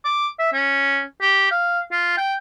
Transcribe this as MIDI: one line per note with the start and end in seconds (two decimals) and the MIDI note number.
0.05 0.28 86
0.39 0.52 76
0.53 1.04 61
1.21 1.47 67
1.51 1.81 77
1.91 2.15 65
2.17 2.35 79